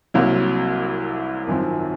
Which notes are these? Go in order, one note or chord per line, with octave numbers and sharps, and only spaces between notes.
C2 C3 F#3 A#3
G#1 F#2 F3 C4